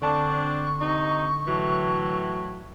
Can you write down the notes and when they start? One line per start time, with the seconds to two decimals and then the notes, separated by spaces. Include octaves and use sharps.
0.02 D3 C4 D4 A5 C#6
0.78 C3 D#4
1.47 A2 E3 F#3